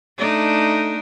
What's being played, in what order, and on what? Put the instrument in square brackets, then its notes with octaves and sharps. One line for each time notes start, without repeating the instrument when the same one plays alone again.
[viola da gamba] A3 D4 D#4